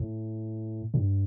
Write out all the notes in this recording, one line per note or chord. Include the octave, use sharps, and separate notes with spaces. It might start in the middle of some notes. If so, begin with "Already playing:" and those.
Already playing: A2
G2